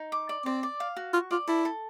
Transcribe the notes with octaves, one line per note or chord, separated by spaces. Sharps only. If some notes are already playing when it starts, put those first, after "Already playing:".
Already playing: D#4
D6
D5
C4 D5
D5
F5
F#4
F4 C#6
F4 D5
E4 A4
A4